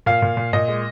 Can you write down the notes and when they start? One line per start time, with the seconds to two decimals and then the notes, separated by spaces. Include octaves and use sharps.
0.06 A#2 F5
0.22 A#2
0.37 A#2
0.53 A#2 D#5
0.68 G#3